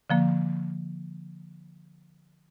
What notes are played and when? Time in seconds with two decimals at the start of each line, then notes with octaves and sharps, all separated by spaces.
0.10 D3 F3 A#3